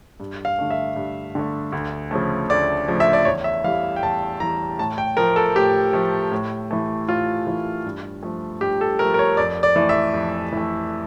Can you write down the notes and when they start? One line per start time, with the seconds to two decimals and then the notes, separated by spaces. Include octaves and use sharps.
0.20 G2
0.45 F5
0.59 D3 A3
0.70 E5
0.96 G2
1.35 D3 A3
1.72 D2
2.11 C#3 F3 A3
2.50 D2 D5
2.88 C#3 F3 A3
3.00 E5
3.13 D5
3.25 E2 C#5
3.44 E5
3.64 E3 G3 F5
3.96 G5
4.03 E2 A5
4.40 E3 G3 A#5
4.78 A2 A5
4.98 G5
5.17 F3 A3 A#4
5.36 A4
5.56 A2 G4
5.93 F3 A3
6.32 A2
6.71 E3 A3
7.08 A2 F4
7.47 E3 A3
7.85 G2
8.23 F3 A3
8.61 G2 G4
8.81 A4
8.99 F3 A3 A#4
9.14 A#4
9.19 C#5
9.37 F2 D5
9.63 D5
9.76 E3 A3
9.89 E5
10.14 F2
10.52 E3 A3